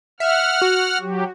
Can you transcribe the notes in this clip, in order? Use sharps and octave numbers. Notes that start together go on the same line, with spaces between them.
E5 F#5 F6
F#4
F#3 G4